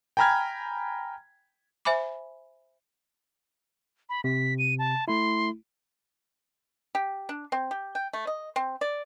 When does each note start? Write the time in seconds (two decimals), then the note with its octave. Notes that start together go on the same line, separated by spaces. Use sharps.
0.17 G5 G#5 A#5 B5 F6 G#6
1.85 C5 E5 G#5 B5 D6
4.09 B5
4.24 C3 B6
4.59 D#7
4.79 A5
5.08 A3 E4 C6
6.95 G4
7.29 D4
7.52 C4
7.71 G4
7.95 G5
8.13 A3
8.27 D#5
8.56 C4
8.81 D5